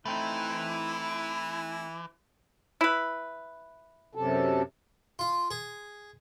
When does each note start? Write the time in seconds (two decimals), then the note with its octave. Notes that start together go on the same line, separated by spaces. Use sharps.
0.06 E3 A3 C4 D#4 E4
2.81 E4 B4
4.15 F#2 C3 A4
5.19 F4
5.51 G#4